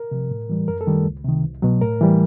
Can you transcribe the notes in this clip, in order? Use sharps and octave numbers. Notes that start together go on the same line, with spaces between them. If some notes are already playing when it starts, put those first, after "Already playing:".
Already playing: A#4
C3 F3
A2
E3 G3
F#2 A#4
A4
D#3 G3
C#2
C3 D#3
C2
B2 F#3
A2 A#4
E3 G3